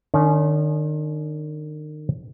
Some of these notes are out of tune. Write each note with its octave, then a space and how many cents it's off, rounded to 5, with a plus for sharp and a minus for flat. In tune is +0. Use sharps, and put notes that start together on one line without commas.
D#3 -35 C#4 +35